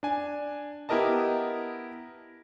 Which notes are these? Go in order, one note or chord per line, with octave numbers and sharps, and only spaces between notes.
D4 G#5
B3 E4 G4 A#4 D#5 A5